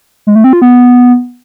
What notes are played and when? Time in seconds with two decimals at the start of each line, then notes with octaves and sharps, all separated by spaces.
0.27 G#3
0.35 A3
0.44 C4
0.53 F4
0.62 B3